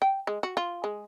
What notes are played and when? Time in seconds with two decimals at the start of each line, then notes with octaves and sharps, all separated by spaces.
0.02 G5
0.27 G#3
0.43 F#4
0.57 F4
0.84 G#3